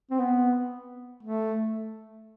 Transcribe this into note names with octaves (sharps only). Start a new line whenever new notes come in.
C4
B3
A3